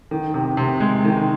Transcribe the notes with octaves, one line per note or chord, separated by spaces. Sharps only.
D#3
C3
C3
G#3
D#3